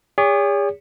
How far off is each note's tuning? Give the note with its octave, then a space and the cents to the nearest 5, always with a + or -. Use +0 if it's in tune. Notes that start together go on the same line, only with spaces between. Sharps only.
G#4 -40 C#5 +45